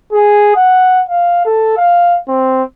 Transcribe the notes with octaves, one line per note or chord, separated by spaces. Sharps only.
G#4
F#5
F5
A4
F5
C4